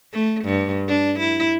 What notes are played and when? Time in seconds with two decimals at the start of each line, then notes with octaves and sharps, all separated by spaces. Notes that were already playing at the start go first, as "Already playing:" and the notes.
0.13 A3
0.45 G2
0.88 D4
1.19 E4